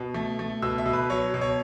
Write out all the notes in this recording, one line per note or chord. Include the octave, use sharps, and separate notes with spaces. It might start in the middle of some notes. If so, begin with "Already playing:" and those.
Already playing: B2
A3
A3
B2 E6
E5
B2
B4
F#3 C#5
B2
C#5